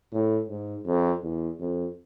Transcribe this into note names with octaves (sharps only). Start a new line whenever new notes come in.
A2
G#2
F2
E2
F2